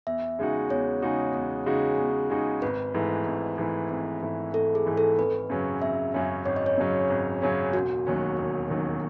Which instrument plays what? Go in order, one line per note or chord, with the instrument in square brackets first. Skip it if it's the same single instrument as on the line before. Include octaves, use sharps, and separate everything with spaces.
[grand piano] E2 [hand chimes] E5
[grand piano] C#3 G#3 D#4 F#4
[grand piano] E2 [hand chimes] C#5
[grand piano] C#3 G#3 D#4 F#4
E2
C#3 G#3 D#4 F#4
E2
C#3 G#3 D#4 F#4
[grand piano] G#1 [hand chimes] B4
[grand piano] G#2 E3 A3 E4
G#1
G#2 E3 A3 E4
G#1
G#2 E3 A3 E4
[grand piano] G#1 [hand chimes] A4
[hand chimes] G#4
[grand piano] G#2 E3 A3 E4
[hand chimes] A4
[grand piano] G#1 [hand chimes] B4
[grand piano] F#2 C#3 F#3 C#4
[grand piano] G#1 [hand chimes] E5
[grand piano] F#2 C#3 F#3 C#4
[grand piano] G#1 [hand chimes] C#5
[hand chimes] D#5
C#5
[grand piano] F#2 C#3 F#3 C#4
G#1
F#2 C#3 F#3 C#4
[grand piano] E1 [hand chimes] F#4
[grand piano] D#2 D#3 F#3 C#4
E1
D#2 D#3 F#3 C#4